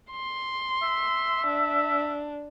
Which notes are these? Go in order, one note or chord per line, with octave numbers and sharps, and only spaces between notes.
C6
E5
D4